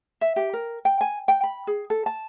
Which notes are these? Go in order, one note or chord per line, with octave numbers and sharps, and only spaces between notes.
E5
G4
A#4
G5
G#5
G5
B5
G#4
A4
A5